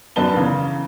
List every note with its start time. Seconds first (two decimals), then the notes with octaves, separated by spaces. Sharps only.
0.16 F#2 D#3 D4 B4 A5 G7
0.37 E2 C#3 E3